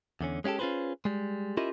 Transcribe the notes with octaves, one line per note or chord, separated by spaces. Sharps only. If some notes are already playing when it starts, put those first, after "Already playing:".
E2 D3 C#4
G#3 C#4 F4 G4 A4
C#4 F4 F#4 G#4 B4 C5
G3 G#3
C#4 E4 F4 G4 A#4 D#5